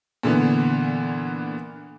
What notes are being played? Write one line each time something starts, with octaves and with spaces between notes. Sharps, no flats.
A#2 D3 E3 B3